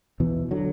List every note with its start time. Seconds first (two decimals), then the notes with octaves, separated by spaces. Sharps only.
0.20 E2 B2 E3
0.51 D3 F#3